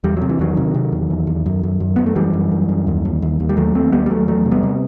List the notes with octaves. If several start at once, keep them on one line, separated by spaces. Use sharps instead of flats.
E2 G3
C3 F#3
E3
E2 D#3 F#3
C3
C3
E2
E2
E2
F#2
F#2
F#2
F#2 B3
A3
F#2 E3 G3
F#2
F#2
F#2
D#2
D#2
D#2
D#2
G3
D#2 F#3 A3
D#2 A3 C4
D#2 G3 B3
G3
D#2 F#3 A3
E2 F#3 A3
C3
G3 B3
C3